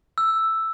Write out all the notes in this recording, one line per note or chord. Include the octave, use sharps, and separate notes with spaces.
E6